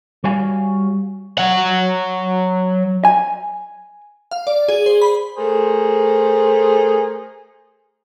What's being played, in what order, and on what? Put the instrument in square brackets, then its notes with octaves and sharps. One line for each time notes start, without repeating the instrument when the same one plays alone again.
[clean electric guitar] G3 F#4 C#5 F5 G#5
[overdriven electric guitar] F#3 F#5
[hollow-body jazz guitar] G#5
[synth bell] F5
D5
G#4
C5
B5
[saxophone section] A3 G#4 A#4 C5